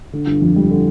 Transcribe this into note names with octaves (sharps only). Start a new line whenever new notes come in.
D3
G1
F2
G3
D3